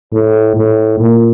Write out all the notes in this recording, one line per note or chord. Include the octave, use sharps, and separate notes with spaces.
A2
A2
A#2